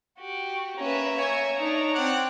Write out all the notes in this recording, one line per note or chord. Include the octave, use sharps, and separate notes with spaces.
F#4 G4
A#3 C#4 B4 E5 A#5
C#5 G#5
D4 D#4 F7
C4 F#5 D6